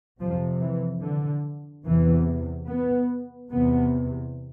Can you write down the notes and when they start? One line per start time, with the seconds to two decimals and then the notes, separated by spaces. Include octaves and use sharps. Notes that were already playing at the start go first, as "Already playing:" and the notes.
0.20 F2 C3 F3
0.61 E3
1.03 D3
1.85 E2 C3 E3
2.68 B3
3.51 E2 C3 B3